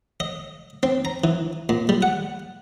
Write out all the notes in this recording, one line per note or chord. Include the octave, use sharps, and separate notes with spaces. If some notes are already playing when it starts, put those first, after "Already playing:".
D#5
C4
A#5
E3
A#2
G3
F#5